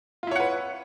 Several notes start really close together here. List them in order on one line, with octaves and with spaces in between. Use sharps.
F4 E4 C#5 F#5 B4